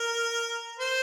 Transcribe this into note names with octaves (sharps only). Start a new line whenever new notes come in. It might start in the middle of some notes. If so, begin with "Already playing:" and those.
Already playing: A#4
C5